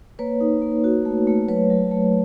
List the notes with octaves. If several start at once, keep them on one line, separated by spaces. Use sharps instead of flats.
A#3 B4 C#5
D#4
A#3
F#4
A3
A3
F#3 B4 C#5
F#3
A3